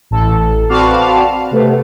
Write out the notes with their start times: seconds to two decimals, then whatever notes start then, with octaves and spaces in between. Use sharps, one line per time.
0.11 A1 A4
0.69 C4 F#4 B4 D5 F5 A5
1.51 C3 A3 B3